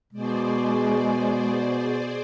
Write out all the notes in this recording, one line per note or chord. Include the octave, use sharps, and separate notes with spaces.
B2 G#3 G#4 C5 D5